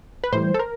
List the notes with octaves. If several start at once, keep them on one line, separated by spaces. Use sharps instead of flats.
B4
A2 E3 G3 C5
A4
A#4